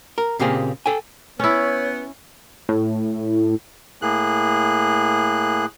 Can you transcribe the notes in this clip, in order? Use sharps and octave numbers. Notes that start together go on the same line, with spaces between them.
A#4
A#2 C#3 A#3 C4 G4 G#4
A4 G5 G#5
B3 C#4 E4 C#5
A2
A2 A#3 G#4 F#6